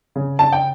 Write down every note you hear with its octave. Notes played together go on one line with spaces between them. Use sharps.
C#3
C#3 A5
G5